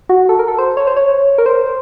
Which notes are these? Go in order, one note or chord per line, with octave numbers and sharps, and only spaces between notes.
F#4
A4
A#4
A4
C5
C#5
C5
C#5
A#4
C5